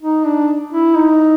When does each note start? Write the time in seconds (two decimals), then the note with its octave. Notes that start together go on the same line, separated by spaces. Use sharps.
0.02 D#4
0.26 D4
0.73 E4
0.97 D#4